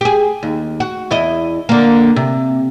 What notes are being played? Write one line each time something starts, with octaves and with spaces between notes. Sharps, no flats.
G4 G#4
D#2
F#4
E2 E4 D#5
D3 A#3
C3